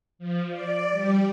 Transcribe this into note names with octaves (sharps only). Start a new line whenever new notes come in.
F3
D5
G3